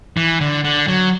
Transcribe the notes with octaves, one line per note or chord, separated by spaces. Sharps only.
E3
D3
D3
F#3